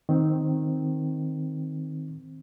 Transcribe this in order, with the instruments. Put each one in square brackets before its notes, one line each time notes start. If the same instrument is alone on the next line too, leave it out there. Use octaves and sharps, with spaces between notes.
[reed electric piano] D#3 C4